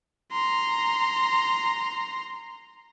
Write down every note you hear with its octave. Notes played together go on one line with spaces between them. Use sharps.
A#5 C6